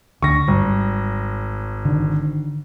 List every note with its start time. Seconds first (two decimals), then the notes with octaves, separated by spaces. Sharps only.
0.22 D2 D3 C#6 A#6
0.48 G#1 G3
1.85 D3 D#3